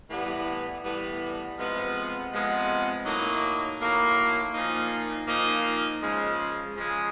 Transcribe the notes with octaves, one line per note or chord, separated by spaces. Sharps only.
A2 E3 G3 B3
A2 E3 G3 B3
C3 F3 G#3 B3
C3 F3 G#3 B3
A2 F#3 A#3 D#4
A2 F#3 A#3 D#4
A#2 F3 A#3 D#4
A#2 F3 A#3 D#4
C#3 F3 G#3
C#3 F3 G#3